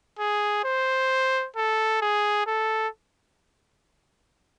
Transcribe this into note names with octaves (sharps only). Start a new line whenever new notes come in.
G#4
C5
A4
G#4
A4